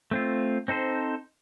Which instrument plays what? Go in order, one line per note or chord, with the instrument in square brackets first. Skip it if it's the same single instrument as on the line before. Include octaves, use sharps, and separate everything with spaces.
[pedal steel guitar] A3 C4 F4
C4 D#4 A4 C5